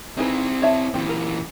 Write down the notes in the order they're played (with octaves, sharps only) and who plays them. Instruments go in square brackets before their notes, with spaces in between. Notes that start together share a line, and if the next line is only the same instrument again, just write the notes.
[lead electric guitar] C4 E4 [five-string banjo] D#4 G#4 B4
[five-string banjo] C#5 E5 A5
[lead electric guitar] A#2 E3 [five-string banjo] C4 C5
[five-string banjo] A#4